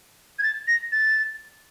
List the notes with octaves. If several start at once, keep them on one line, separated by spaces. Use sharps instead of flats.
G#6
A6
A#6
A6